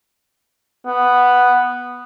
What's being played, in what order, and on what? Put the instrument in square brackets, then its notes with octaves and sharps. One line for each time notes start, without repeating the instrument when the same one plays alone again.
[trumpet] B3